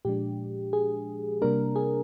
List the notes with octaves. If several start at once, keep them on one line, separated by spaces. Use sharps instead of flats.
A#2 F3 G#3 D4 G4
G#4
C3 G3 A#3 D4 A#4
G#4